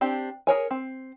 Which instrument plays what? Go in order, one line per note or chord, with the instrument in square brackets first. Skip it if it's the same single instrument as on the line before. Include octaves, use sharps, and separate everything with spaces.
[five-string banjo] C4 D4 G4
G#4 A#4 C#5 G#5
C4